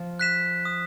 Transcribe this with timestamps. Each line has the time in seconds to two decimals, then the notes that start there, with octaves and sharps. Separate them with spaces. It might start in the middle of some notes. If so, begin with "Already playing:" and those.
Already playing: F3
0.19 F#6 B6 E7
0.65 D#6